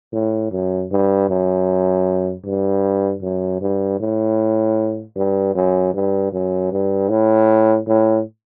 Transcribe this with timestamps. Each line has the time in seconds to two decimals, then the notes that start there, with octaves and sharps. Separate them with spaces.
0.13 A2
0.51 F#2
0.91 G2
1.29 F#2
2.44 G2
3.22 F#2
3.61 G2
4.00 A2
5.16 G2
5.55 F#2
5.94 G2
6.32 F#2
6.72 G2
7.09 A2
7.87 A2